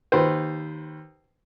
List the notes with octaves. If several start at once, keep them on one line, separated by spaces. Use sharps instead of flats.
D#2 B4 C5